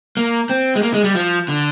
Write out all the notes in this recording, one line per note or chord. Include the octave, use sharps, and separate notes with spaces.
A#3
C4
G#3
A#3
G#3
G3
F3
D3